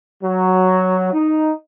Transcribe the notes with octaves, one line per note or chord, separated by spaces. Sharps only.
F#3
D#4